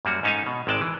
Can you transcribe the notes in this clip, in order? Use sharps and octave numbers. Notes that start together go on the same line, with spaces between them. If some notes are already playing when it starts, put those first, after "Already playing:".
F#2 G3 A#3 F#4
G#2 C#4 D#4 A4 F5 G#5
B2
G#1 C3 G#3 D5 G5 A5
E3